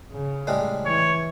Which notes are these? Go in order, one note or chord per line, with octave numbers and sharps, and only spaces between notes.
C#3
A2 G3 G#3
E3 C#5